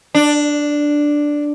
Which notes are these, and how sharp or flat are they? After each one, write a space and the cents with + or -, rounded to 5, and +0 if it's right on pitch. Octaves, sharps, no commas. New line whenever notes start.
D4 +0